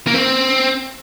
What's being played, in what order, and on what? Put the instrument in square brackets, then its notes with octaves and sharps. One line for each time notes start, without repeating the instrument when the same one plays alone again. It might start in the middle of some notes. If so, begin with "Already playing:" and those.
[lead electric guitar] A#3
C4